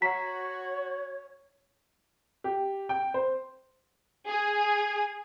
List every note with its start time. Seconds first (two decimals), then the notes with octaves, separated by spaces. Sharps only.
0.02 F#4 C#5 F#5 A#5 B6
2.44 G4
2.89 G5
3.14 C5
4.27 G#4